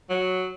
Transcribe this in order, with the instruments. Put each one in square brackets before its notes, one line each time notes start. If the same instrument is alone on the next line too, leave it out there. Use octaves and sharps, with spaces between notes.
[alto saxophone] F#3